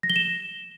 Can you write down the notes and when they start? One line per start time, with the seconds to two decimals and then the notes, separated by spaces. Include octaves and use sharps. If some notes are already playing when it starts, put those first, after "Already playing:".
0.03 A#6
0.10 G7
0.16 E7